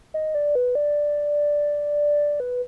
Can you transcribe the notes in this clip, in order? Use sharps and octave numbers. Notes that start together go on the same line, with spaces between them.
D#5
D5
B4
D5
B4